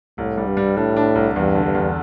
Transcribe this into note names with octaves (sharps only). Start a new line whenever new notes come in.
C2 A2
G3
G2
G3
A2 D4
D4
C2
E2 G2
D3
G2
E2